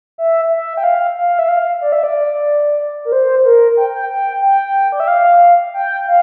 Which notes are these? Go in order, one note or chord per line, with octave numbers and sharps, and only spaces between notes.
E5
E5
G5
F5
F5
E5
F5
D5
E5
D5
A#4
C5
A#4
G5
G5
G5
G5
D5
E5
F5
G5
F5